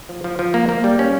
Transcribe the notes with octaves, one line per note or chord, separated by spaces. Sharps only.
F3
F3
F3
A#3
A#3
G3
C#4